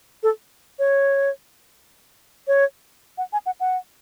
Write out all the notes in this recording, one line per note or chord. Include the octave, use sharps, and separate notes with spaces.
A4
C#5
C#5
F#5
G#5
F#5
F#5